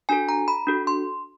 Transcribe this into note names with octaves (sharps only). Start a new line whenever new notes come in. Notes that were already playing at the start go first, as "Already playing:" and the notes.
D4 F#4 A4 G#5
A#5
B5
D4 F#4 A4
C6